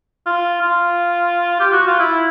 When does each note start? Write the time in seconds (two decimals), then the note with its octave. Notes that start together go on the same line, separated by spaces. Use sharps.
0.26 F4
0.62 F4
1.60 G4
1.73 F#4
1.87 F4
1.99 E4